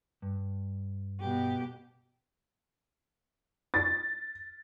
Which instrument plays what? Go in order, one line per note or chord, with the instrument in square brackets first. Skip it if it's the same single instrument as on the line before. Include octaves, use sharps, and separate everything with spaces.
[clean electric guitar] G2
[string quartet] B2 G4
[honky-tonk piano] A6